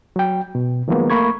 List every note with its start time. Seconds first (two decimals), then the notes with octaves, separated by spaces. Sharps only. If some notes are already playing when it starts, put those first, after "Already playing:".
0.16 F#3 G5
0.55 B2
0.88 D#3 F3 F#3 G#3 A#3 B3
1.10 A3 A#3 B5 C#6 G#6